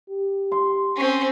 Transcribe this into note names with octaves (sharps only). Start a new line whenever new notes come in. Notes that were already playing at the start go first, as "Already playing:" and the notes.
G4
C6
C4 C#4